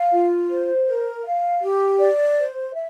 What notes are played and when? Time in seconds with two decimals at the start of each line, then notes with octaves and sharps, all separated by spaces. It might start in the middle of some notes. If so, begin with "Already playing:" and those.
Already playing: F5
0.12 F4
0.49 C5
0.86 A#4
1.24 F5
1.62 G4
1.99 D5
2.37 C5
2.74 E5